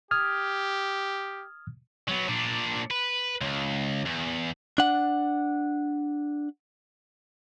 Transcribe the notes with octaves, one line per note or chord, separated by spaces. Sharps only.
G4 D#6 F6 G#6
F#3 B3
A#2 D4
B4
C#2
E2
D4 F#5